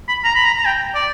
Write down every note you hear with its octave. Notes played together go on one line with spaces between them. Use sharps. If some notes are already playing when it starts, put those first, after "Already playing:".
B5
A#5
B5
A#5
A#5
G5
D5